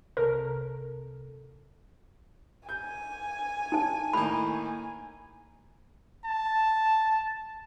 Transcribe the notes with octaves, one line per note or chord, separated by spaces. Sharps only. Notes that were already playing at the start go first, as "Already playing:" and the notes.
C2 C3 A4 A#4
G#5 G6
D#4 A5
A2 D#3 A#3 B5
A5